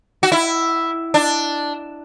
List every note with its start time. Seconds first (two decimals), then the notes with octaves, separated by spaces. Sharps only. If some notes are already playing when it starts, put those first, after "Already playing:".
0.23 F#4
0.32 E4
1.14 D4